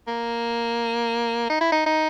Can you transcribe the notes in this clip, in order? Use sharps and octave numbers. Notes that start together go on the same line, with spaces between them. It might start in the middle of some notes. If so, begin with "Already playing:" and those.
A#3
D#4
E4
D#4
D#4